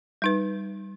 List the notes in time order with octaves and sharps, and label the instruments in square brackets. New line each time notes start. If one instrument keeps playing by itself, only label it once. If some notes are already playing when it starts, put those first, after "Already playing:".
[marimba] G3 D#4 B4